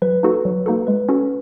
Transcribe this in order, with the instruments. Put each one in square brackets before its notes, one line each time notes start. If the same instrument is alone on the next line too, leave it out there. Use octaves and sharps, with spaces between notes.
[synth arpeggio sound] F#3 [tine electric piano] B4
[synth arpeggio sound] A#3 D#4 F#4 A4
F#3
A#3 D#4 F#4 A4
[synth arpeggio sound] G#3 [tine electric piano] B4
[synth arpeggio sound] C#4 F#4 A4